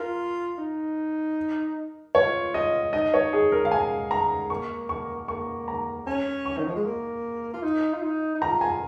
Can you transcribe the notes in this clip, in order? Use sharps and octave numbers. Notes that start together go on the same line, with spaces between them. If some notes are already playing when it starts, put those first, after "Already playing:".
Already playing: F4 A#4
D#4
F4 C#5
D#5
D#4 D#5
C#5
G#4
A#4
F5
G#5
A#5
A#3 C#6
C#6
A#3 C#6
A#5
C#4 G#5
C#6
D#3
F3
G#3
A#3
F4
D#4
F4
D#4
D#4
F4 A#5
G#5